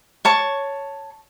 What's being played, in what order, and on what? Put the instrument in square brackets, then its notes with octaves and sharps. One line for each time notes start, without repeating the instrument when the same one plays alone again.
[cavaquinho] C#5 A5 C#6